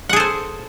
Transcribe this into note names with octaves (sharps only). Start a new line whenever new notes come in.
G#4 A4 C5 F#5